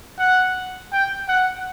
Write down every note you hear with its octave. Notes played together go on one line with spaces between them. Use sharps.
F#5
G5
F#5